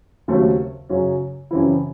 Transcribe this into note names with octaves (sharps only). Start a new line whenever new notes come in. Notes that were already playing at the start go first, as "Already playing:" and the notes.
D#2 C#3 F#3 A3 C4
F#2 C#3 F#3 C#4
F#2 C#3 E3 C4 E4